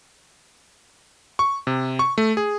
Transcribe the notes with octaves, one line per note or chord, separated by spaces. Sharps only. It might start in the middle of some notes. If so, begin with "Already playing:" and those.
C#6
C3
C#6
A3
G#4